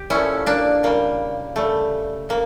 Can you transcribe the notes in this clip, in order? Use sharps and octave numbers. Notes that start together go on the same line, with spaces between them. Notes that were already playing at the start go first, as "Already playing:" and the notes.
Already playing: G4
A#2 F3 A3 C#4 E4
A#3 D4
C#3 G3 A#3
C#3 G3 A3
C#3 A#3